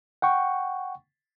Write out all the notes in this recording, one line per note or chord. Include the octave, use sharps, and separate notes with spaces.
F#5 G5 C#6